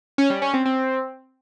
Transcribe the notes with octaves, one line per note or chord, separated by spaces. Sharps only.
C#4
G3
C#4
C4
C4